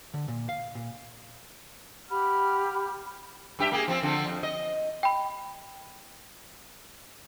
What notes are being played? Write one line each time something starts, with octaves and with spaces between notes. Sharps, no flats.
D3
A#2
F5
A#2
G4 F#5 B5 F6
G2 G4 E5
A#3 G4 G#4
F3 C4
D3 F3 C4
F2
D#5
G5 B5